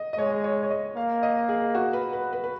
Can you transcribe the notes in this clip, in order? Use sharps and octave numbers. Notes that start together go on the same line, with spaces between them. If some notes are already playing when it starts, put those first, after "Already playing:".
Already playing: D#5
D#5
G#3 C#5
C#5
C#5
D#5
A#3 F5
D#5
G#4
F#4
B4
B4
B4
B4